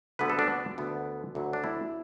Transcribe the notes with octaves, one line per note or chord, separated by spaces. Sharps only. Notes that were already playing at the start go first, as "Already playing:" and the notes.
D2 D3 B3 B4
A4
D4
D2 D3 B3
D2 D3 F#3
D4
E4